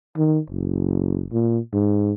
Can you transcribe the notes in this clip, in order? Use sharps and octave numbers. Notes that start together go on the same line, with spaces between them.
D#3
F#1
A#2
G#2